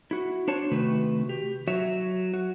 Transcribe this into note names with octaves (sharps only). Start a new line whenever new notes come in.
E4 F#4
D4 C5 C#5 A5
C3 D#3 A3 F#4 B4
G4
F#3 F#4 C#5 E5
F#4